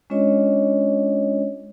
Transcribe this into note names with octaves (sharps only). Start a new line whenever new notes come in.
G#3 C#4 D4 F4 C#5 D#5